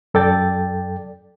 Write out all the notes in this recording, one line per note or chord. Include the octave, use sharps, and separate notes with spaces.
F#2 A4 D5 G5 A6